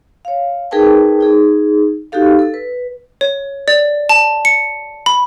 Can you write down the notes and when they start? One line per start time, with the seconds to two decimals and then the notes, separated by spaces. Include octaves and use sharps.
0.25 C#5 F5
0.71 D#4 G#4 A#4 B4 G5 A5
1.21 D#4 G#4
2.12 D#4 F#4 G4 A4 F5
2.39 A4 E6
2.54 B4
3.21 C#5
3.68 D5
4.09 A5
4.45 C#7
5.06 B5